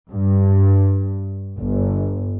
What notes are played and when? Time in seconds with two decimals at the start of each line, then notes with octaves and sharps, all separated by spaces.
0.10 G2
1.57 G1